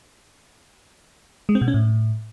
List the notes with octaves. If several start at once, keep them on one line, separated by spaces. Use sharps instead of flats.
G#3
C4
B2
C#4
A2